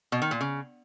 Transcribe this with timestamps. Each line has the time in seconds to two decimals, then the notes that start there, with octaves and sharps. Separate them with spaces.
0.12 B2
0.22 D#3
0.31 A#2
0.41 C#3